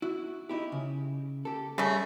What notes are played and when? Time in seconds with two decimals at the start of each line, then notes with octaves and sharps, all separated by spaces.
0.02 E4 F#4
0.49 D#4 E4 G4
0.72 C#3
1.45 G4 A4
1.78 C#3 G3 A3